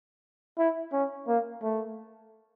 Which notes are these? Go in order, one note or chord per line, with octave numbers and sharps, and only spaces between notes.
E4
C#4
A#3
A3